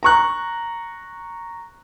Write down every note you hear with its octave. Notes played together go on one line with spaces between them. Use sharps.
A#5 C#6 F#6